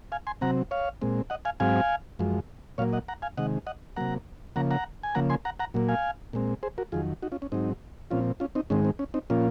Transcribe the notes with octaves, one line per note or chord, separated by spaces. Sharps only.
F5 G#5
G#5 C6
C3 F#3 C4 F#5 A#5
C#5 F5
A#2 G#3 C4
D#5 F#5
F5 G#5
G#2 F#3 C4 F5 G#5
F#2 F3 G#3
A#2 F#3 A#3 C#5 F5
D#5 F#5
F#5 A#5
F5 G#5
C3 D#3 G#3 D#5 F#5
D#5 F#5
C3 F#3 A#3 F#5 A#5
C#3 F3 A#3 F#5 A#5
F#5 A#5
G#5
C#3 F3 A#3 F#5 A#5
G#5 C6
F#5 A#5
F#5 A#5
A#2 F#3 A#3
F5 G#5
A#2 G#3 C4
G#4 C5
F#4 A#4
F2 D#3 F#3 F4 G#4
D#4 F#4
C#4 F4
C#4
G#2 F#3 C4 D#4
A#2 F3 C4 C#4 F4
C#4 F4
C4 D#4
G#2 D#3 G#3 C4 C#4
C4
C#4
C4 D#4
A#2 F3 A#3 C#4 F4